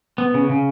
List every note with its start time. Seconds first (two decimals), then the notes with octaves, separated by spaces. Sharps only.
0.18 B3
0.34 C#3
0.49 C#3